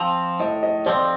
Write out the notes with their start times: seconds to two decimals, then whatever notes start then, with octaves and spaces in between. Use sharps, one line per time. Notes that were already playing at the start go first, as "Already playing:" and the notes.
Already playing: F3 C4
0.40 A2 D#5
0.63 D#5
0.86 F3 C4 D5